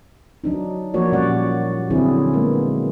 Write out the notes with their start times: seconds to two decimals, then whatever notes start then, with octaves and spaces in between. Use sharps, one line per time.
0.44 F#3 D4 D#4
0.94 F3 A#3 F#4 C#5 D5
1.12 A#2 G3 C#4 D5 F#5
1.90 D3 F#3 C4 E4 G#4
2.33 G#3 A#3 B3